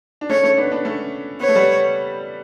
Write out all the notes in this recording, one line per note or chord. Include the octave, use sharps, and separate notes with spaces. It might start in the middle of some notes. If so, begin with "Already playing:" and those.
D4
A3 C#4 C#5
A3 C#4
B3 D4
B3 D4
A3 C#4
B3 C#5
A3
G3 B3